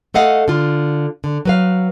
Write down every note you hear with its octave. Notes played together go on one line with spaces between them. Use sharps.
A3 A4 D#5 F5 F#5
D3 F4
D3
F#3 B4 F5